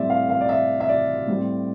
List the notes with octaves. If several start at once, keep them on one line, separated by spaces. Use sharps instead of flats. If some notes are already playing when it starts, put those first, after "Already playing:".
Already playing: A2 G3 C4 D5 E5
F5
F5
D5
E5
E5
D5
A2 G3 C4